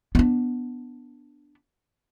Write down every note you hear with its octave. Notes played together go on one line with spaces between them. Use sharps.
B3 D4